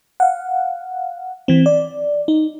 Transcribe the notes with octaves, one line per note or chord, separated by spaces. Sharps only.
F5 F#5
E3 C4
D5
D#4